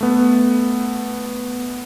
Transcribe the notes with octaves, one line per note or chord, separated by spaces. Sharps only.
A3 B3